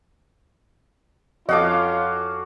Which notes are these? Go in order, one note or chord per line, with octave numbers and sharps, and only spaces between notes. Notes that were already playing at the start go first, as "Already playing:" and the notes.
F2 C#4 F4 F#4 A4 D#5 F5 D6